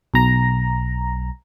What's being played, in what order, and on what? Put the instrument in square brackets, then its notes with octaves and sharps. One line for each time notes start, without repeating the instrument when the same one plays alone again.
[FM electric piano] B1 A#5